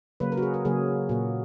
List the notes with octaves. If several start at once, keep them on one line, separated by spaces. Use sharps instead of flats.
C#3 F#3 A#3 B4
A#4
F#4
G#4
A#4
C#3 F#3 A#3 G#4
A#2 A#3 F#4